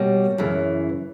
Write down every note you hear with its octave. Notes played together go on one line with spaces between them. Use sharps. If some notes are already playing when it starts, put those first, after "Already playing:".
Already playing: B2 G3 A#3 C#5
F#2 C#3 E3